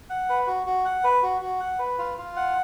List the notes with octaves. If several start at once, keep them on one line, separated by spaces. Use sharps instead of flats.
F#5
B4
F#4
F#4
F#5
B4
F#4
F#4
F#5
B4
F4
F4
F#5